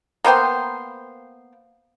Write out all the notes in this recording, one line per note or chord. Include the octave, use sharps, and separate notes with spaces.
A#3 B3 C5 G5